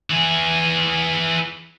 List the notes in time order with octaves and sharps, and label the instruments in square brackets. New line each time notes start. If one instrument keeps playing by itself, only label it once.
[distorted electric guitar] E3 G#4